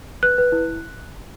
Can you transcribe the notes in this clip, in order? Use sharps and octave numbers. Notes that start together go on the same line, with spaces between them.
B4 F#6
B4
E4